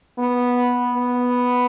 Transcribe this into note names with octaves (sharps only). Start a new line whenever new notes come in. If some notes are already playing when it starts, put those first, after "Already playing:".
B3
B3